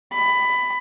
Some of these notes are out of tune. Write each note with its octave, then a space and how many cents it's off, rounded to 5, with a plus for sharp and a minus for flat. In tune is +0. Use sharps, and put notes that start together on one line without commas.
B5 +15